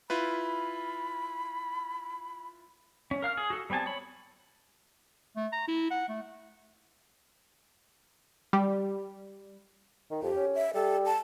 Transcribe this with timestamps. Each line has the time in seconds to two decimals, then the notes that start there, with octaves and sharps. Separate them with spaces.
0.10 E4 F4 B4 B5
3.11 C#4
3.22 A#4 F5 F6
3.37 G#4
3.50 F#4 A4
3.70 G3 B3 C4 G#5 A5
3.86 C#5 B5
5.36 A3
5.52 A#5
5.68 E4
5.91 F#5
6.09 A3
8.53 G3
10.11 D#3
10.22 F2 G4
10.36 C#4
10.55 E5
10.74 G3 A4
11.05 A5